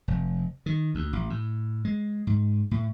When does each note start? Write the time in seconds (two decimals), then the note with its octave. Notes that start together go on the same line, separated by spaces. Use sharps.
0.08 F1
0.66 D#3
0.95 D2
1.13 A1
1.30 A2
1.85 G#3
2.27 G#2
2.71 A2